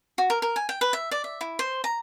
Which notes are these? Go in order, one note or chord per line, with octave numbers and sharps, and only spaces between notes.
F#4
A#4
A#4
G#5
G5
B4
E5
D5
E5
E4
C5
A#5